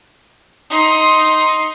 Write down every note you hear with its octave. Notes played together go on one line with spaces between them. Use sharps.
D#4 C6